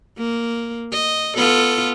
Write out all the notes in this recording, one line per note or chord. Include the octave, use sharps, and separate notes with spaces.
A#3
D#5
B3 F4 A4